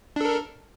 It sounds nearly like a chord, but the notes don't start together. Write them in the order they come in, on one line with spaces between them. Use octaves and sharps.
D4 A4 A#4